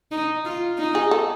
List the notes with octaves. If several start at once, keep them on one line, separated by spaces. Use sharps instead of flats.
D#4
F4
D#4
G#4
A4